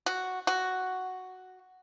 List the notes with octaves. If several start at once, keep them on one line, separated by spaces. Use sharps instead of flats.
F#4
F#4